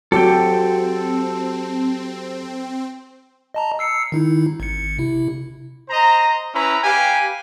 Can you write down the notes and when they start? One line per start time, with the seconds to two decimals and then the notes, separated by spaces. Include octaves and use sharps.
0.12 F#3 C4 F#4 G4 A4 G5
3.54 D#5 A5 A#5
3.79 E6 C7 C#7
4.12 D#3 D#4 E4
4.60 G#1 C#7
4.98 C3 E4
5.90 C5 D#5 A#5
6.54 C#4 E4 B4 A#5
6.84 G4 B4 F5 G5 G#5